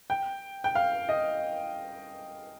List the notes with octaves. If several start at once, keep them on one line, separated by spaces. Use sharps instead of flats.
G5
G5
F5
D#5